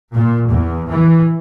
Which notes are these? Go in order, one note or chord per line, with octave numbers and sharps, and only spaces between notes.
A#2
E2
E3